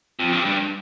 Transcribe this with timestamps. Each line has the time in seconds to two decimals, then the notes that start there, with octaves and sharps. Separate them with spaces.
0.19 F2
0.33 G2
0.45 G2